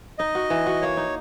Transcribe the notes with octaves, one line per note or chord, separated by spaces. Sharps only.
D#4 D#5
F#4
E3
F#4
A#3 C#5
D#4